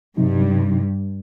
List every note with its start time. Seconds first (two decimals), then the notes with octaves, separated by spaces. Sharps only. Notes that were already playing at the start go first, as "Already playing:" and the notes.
0.17 G2 C3 F#3 D#4